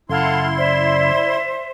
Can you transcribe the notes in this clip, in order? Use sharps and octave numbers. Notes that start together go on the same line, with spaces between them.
F#2 C#3 E4 A4 F5 F#5 C6
C5 D5 E5